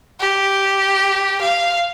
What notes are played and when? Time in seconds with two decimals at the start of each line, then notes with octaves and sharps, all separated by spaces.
0.20 G4
1.41 F5